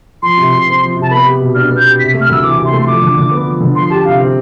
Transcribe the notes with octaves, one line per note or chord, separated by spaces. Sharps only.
F3 C6
C3
C3
C4
F3
C3
A5
B3 B5
G4
B2
D4 F6
B3
G6
G4
C3 B6
A3
F6
D2 E6
E3 D6
C3
C6
A3
C6
F3 D6
D3
D3
B3
F3
D3
F3 C6
G4 A5
C3 F5
C4